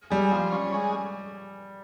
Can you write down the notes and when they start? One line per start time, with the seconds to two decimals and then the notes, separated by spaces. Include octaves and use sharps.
0.10 G3 G#3
0.32 F3 G3
0.52 C#4
0.74 G#3